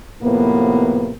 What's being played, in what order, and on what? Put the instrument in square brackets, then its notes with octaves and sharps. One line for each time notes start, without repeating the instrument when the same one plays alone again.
[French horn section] A2 C3 F3 A#3 B3